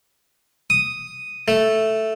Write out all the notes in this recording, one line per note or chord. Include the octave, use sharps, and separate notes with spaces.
D#6
A3